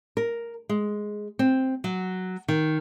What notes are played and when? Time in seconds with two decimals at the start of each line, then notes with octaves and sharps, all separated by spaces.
0.17 A#4
0.69 G#3
1.39 C4
1.84 F#3
2.48 D#3